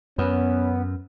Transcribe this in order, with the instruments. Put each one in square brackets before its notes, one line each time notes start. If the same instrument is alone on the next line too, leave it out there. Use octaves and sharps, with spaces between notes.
[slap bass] F#2 [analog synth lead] B3 [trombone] C#4